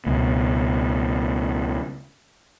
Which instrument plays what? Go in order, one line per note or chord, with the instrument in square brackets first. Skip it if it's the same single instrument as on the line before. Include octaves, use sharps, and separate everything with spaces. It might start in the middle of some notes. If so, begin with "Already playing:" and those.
[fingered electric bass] C#2 B2